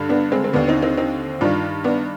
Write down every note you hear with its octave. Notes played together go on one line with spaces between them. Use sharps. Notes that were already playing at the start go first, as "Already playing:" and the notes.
Already playing: G2 D3
B3 D4
G#3 C4
C4
D#2 D3 B3 D4
C4 D#4
C4 D#4
C4 D#4
G2 D#3 D4 F4
B3 D4